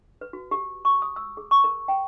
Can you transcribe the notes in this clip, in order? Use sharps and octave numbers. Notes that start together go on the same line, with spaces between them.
B4
F#4
G4
C#6
D#6
E6
G#4
C#6
A#4
G5